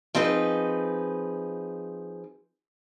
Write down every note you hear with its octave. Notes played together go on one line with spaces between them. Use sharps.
F3 C4 D#4 G#4 B4